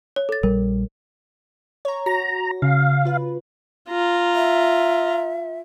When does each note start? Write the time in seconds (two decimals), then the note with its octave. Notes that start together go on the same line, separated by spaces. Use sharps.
0.16 C#5
0.29 A4 A6
0.43 A#1 G3 A#4
1.85 C#5 A#5
2.06 F#4 A#5 A#6
2.62 C#3 F5
3.05 F4 B4
3.90 F4 A#5
4.35 E5